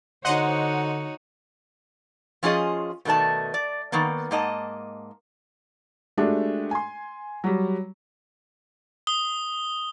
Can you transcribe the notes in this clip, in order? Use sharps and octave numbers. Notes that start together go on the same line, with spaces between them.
D3 D#4 F#4 C5 C#5 D#5 F#5
F3 C#4 F4 G#4 D#5
B2 D#3 A3 D5 A5
D5
D#3 A#3 B3
G#2 A#3 D#5 A5
G#3 A3 D4 F#4 G4
G#5 C6
F#3 G3
D#6 G7